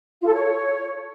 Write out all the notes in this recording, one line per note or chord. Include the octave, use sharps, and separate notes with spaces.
F4
A4
C#5